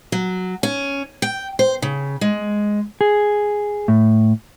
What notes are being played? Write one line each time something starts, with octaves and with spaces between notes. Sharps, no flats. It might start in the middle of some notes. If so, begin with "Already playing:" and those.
F#3
C#4
G5
C5
C#3
G#3
G#4
A2